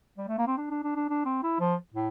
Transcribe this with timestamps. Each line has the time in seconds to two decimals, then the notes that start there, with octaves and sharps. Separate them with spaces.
0.18 G3
0.28 A3
0.38 A#3
0.47 C4
0.57 D4
0.70 D4
0.83 D4
0.95 D4
1.09 D4
1.25 C4
1.43 E4
1.60 F3
1.94 A2